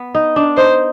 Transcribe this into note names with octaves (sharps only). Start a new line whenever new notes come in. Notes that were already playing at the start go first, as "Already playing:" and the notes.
Already playing: B3
D#4
D4
D#4 C5